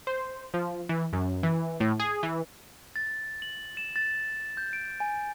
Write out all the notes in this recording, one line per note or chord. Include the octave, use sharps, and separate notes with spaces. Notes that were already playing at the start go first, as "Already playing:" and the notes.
C5
F3
E3
F#2
E3
A2
G#4
E3
A6
F#7
E7
A6
G6
D7
G#5